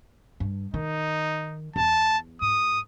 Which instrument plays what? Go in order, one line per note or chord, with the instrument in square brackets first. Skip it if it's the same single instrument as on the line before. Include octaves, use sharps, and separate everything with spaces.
[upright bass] G2
[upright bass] D#3 [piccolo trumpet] D#4
[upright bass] E2 [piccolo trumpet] A5
[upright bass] G#2 [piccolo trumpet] D#6